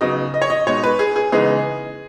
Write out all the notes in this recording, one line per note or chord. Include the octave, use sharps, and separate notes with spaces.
C#3 F#3 B3 D#4 D#5
D#5
C#5
D#5
B2 G#3 D#4 C#5
B4
G#4
G#4
C#3 E3 G#3 B3 D#4 G#4